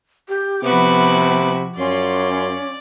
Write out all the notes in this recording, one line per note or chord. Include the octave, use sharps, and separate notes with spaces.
G4
C3 F3 B3 E4 F#4 B5 D6
F#2 C#4 F4 D5 C6